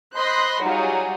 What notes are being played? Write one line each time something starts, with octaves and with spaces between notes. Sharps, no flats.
C5 D#5 B5 C6 F#6 A#6
F#3 G3 D#4 F4 F#4 G#4